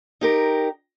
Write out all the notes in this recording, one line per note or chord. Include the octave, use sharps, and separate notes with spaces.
D#4 G4 A#4